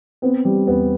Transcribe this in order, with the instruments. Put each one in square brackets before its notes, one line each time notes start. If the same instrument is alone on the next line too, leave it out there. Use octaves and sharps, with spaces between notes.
[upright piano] B3 [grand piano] C4
[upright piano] G3
[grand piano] E2 [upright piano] B3